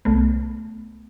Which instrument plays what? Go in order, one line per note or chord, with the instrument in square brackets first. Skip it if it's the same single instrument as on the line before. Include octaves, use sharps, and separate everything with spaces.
[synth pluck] C2 A3 B3